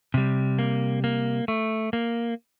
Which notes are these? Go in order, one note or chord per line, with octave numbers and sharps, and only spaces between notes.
C3 G3
A#3
A#3
A3
A#3